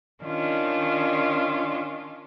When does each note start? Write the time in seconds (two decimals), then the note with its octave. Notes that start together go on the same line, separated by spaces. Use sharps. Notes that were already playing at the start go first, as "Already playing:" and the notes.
0.23 D#3 C#4 D4 F4